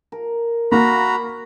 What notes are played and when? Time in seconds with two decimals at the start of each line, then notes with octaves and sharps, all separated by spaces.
0.12 A#4
0.72 A#3 F#4 A#5 B5